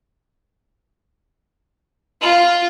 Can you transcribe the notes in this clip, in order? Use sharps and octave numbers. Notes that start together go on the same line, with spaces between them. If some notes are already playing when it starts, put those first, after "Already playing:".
F4